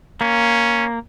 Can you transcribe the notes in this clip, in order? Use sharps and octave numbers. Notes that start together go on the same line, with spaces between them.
A#3 C#4